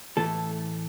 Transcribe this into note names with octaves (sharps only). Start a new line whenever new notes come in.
A2 E3 A3 A4